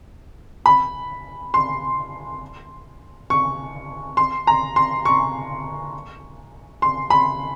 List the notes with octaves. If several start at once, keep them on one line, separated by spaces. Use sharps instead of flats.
B5
C6
C#6
C6
A#5
C6
C#6
C6
B5